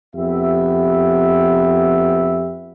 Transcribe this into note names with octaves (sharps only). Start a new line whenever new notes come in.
F2 B3 G4 E5